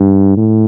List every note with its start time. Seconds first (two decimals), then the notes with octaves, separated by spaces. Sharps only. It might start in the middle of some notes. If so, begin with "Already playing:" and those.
Already playing: G2
0.37 A2